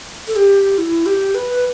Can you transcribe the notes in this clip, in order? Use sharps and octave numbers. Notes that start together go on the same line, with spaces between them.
A4
G4
E4
G4
B4